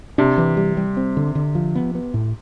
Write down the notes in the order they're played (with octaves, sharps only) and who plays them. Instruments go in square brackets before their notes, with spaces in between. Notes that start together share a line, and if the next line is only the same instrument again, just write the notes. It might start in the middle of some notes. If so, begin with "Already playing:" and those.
[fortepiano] C3 [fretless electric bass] D4
[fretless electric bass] E3
G3
G3
C4
D3
D3
F3
B3
B3
A2